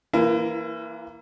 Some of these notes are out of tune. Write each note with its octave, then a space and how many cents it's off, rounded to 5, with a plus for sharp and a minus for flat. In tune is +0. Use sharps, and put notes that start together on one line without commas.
E3 +0 A#3 +0 E4 +40